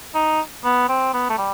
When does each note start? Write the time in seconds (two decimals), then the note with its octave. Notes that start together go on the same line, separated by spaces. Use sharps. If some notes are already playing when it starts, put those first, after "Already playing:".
0.14 D#4
0.64 B3
0.89 C4
1.13 B3
1.30 A3
1.38 G3